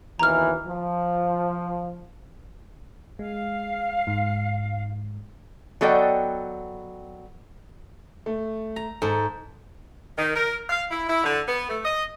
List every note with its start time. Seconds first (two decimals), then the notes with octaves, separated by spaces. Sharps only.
0.19 D#2 B2 E3 A#5 F6
0.66 F3
3.19 G#3 F5
4.07 G#2
5.81 F#3 B3 A4 D5 D#5 G5
8.26 A3
8.76 A#5
9.02 G#2 A4
10.18 D#3
10.36 A#4
10.70 F5
10.91 E4
11.09 E4
11.24 D3
11.48 B3
11.69 A3
11.85 D#5